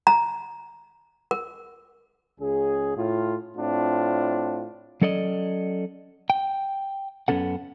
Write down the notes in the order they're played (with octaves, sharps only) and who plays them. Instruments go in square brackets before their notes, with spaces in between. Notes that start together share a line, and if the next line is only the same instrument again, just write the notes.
[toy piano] A#5
A#4
[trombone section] C#2 C#3 G#4
A2 F4
A2 C4 D4 F4
[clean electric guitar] F#3 C#4 A4 D5 D#5
G5
F#2 B3 C#4 A4 F#5